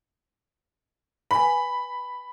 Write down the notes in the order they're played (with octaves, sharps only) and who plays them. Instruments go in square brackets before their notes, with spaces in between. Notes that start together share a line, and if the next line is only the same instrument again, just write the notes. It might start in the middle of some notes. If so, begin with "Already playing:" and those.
[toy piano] B4 G#5 [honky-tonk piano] B5